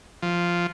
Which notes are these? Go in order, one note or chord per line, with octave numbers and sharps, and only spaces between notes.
F3